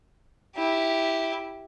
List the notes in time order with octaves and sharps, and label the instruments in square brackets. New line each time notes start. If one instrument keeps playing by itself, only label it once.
[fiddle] E4 G4